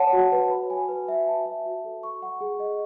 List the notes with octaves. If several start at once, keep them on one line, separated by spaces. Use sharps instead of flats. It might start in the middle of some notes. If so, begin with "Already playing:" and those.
Already playing: C#5 F#5 A5
F#4
B4
B5
G#5
B4
E5
A5
E5
F#4
A4
C#6
F#5
G#4
D#5